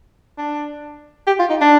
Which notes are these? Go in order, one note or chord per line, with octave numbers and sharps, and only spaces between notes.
D4
G4
F4
D#4
D4